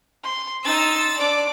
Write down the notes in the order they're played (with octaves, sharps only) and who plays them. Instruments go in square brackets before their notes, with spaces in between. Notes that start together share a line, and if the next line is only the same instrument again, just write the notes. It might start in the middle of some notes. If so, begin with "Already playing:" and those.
[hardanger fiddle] C6
[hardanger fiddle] D#4 C6 [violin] E6 A6
[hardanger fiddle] D4 D6 [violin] D5